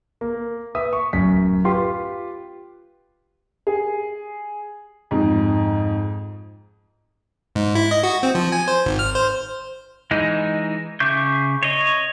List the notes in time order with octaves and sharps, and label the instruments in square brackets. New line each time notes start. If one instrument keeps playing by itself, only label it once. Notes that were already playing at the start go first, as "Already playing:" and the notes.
[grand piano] A#3
B4 E5 D#6
C#6
D1 F#2 B6
F4 G4 B4 C6
[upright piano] G#4
F2 G#2
[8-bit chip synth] G#2
E4
D#5
F#4
C4
F3
G#5
C5
G#1
F6
C5
[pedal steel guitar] E3 G#3 D#4
C#3 E5 C#6 D6 G6
C#5 D#5